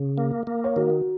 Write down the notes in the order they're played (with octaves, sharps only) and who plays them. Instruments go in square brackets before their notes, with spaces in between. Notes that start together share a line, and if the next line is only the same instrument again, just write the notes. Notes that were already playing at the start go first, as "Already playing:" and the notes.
Already playing: [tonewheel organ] C#3
A#3
A#3
[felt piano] C#5
[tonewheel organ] D#3 [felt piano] F#4 A#4